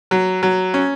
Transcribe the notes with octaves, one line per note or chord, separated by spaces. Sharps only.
F#3
F#3
C#4